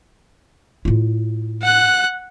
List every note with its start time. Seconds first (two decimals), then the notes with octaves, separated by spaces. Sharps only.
0.85 A2 F4
1.62 F#5 F#6